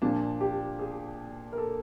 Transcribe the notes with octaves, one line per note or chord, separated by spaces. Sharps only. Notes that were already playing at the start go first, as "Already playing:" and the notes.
A#2 F3 D4
G4
G#4
A#4
A4